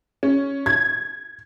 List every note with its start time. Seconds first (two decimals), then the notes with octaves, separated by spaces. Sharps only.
0.23 C#4
0.66 G#6